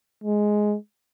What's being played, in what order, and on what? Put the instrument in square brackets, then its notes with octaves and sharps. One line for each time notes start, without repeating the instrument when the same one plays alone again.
[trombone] G#3